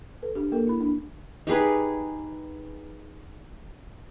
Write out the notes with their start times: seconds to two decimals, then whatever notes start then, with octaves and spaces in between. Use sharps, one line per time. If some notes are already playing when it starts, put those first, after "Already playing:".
0.23 A4 B4
0.35 D4 G4
0.52 A#3 A4 A#4
0.67 E4 B5
0.81 D4
1.47 D#4 G4 G#4 B4